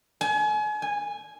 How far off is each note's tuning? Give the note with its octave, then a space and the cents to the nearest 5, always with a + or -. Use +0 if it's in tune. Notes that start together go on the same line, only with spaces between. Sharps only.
G#5 +35
G#5 -10